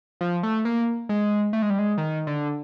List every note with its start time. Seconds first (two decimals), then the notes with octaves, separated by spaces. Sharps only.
0.21 F3
0.43 A3
0.65 A#3
1.09 G#3
1.53 A3
1.62 G#3
1.70 G3
1.79 G#3
1.98 D#3
2.27 D3